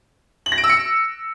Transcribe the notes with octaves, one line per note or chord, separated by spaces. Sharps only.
F#7
A#6
D7
E6
C#7